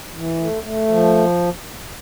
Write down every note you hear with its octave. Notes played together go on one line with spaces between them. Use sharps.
E3
A3
A3
F3